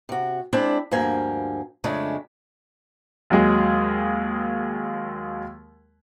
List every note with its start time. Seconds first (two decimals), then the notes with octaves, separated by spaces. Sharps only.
0.09 C3 F#4
0.53 G#3 C4 D4 E4 D5
0.91 D2 G2 F3 A#3 G#5
1.84 F2 C#3 G#3 A3 D4
3.30 D#2 F#3 G#3 G#4